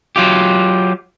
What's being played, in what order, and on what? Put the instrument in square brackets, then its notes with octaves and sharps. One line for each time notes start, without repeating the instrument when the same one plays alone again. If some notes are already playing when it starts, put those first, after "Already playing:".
[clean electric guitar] F#3 F4 G4